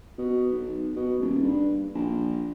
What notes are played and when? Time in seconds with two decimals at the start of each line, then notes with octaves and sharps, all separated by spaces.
0.18 B2
0.51 B1
0.96 B2
1.20 D#1
1.43 G2
1.95 A#1